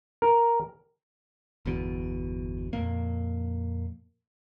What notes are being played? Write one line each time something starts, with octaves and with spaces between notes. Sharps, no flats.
A#4
G1 E2 B2
F2 A#2 A#3